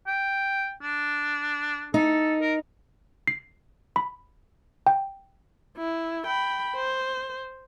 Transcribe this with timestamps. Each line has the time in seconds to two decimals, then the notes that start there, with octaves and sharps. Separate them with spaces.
0.07 G5
0.81 D4
1.94 D#4 A4
2.41 A#4
3.27 C7
3.96 B5
4.87 G5
5.77 E4
6.27 G5 B5
6.76 C5